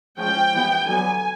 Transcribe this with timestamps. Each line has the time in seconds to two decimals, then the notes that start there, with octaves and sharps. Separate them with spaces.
0.18 F3 G#3 C#4 G5
0.53 E3 G3 B3
0.86 D3 F#3 B3 G#5